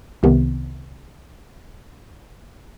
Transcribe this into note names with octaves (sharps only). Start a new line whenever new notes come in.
C2 C3 D#3 B3